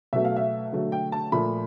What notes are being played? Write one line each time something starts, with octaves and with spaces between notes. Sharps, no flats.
B2 F#3 A3 E5
F5
E5
D3 F#3 A3
G5
A5
A#2 F3 A3 B5